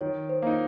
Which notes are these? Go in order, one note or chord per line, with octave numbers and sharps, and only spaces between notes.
D#3 C#5
C5
A#3 D#4